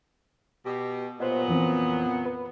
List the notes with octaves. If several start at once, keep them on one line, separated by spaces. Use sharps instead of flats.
B2 G4
A#2 F#3 B3 C5 D#5
F2 E3 C4
B4